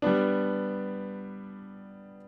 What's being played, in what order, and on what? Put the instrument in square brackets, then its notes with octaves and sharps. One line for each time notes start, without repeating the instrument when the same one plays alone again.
[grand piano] G3 B3 D4